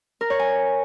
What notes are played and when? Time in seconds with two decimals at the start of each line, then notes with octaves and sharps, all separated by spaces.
0.21 A#4
0.30 C#5
0.39 G#5